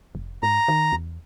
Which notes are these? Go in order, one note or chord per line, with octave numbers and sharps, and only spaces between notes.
F1
G#2 A#5
D#3
E2